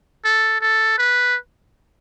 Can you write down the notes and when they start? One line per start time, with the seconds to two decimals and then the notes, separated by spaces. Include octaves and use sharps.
0.25 A4
0.61 A4
0.98 B4